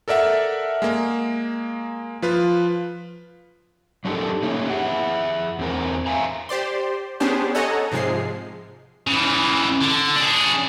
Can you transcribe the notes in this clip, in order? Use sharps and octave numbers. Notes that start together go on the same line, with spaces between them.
A4 A#4 D5 E5 F#5
G#3 A#3
F3 F4 B4
F#3 D4 D#4 G4 A4 A#4
A3 A#3 C#4 D#4 F#4 G4
G#4 E5 F#5
E2 C4 A#4
E5 F5 G#5 A#5
G4 C5 D5 C6
B3 C#4 D4 G4 G#4 C5
A4 C#5 D#5 F#5 G#5 A#5
G#2 C3 F3 G#3 C7
C#3 E3
D3
D4 G#4